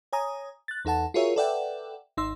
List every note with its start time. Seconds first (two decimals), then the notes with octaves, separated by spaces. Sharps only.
0.13 C#5 G#5 A#5 D#6
0.68 F#6 A6
0.85 E2 D#4 A4 F#5 A5
1.14 F4 F#4 G#4 A#4 C#5 E5
1.36 A4 B4 D5 E5 F#5 G5
2.17 G#1 D#4 C6 E6